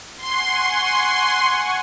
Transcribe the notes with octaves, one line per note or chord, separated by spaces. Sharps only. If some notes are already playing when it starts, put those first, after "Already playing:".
F#5 G#5 C6 C#6